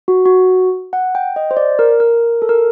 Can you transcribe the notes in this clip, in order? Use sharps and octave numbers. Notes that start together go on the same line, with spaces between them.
F#4
F#4
F#5
G5
D#5
C5
D5
A#4
A#4
A4
A#4